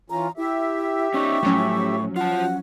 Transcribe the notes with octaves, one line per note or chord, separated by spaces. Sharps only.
E3 C#4 F4 A#5
E4 G4 E5
C#4 D#4 C#6
A2 F3 F#3 C#4
F4 F#5 A5